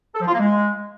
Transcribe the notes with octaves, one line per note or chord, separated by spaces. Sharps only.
A4
F3
F4
A#3
G#3